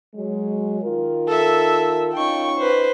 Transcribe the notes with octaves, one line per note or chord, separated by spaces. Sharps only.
F#3 G#3
D#3 F4 A#4
A4 E5
C#4 D#4 F4 G5 C#6
B4 C5